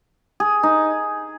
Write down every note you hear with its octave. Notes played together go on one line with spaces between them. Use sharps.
G#4
D#4